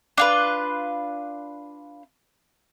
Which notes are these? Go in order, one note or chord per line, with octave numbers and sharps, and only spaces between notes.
D4 F4 B4